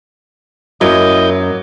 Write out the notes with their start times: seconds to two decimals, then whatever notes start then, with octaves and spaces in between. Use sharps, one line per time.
0.81 F#2 F#3 A#3 E4 D#5 G6